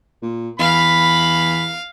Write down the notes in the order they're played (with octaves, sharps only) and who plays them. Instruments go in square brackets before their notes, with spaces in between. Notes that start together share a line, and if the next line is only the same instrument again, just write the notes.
[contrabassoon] A#2
[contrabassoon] E2 [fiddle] F5 [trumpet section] B5